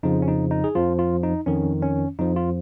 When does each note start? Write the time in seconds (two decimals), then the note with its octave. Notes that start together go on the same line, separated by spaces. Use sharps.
0.03 F2 C#3 F3 D#4
0.22 C#4
0.28 D#4
0.51 D#4
0.64 G#4
0.75 F2 F3 F4
0.99 F4
1.23 D#4
1.47 F2 D#3 C#4
1.82 C#4
2.19 F2 F3 D#4
2.36 F4